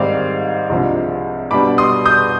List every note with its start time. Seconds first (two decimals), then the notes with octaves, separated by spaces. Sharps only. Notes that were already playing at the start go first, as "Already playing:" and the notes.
Already playing: G#2 D#3 G3 C4 D5 F5
0.70 C2 C3 F3 G#3 D4
1.51 B2 G3 D4 B5 D6
1.78 C6 D#6
2.05 D#6 G6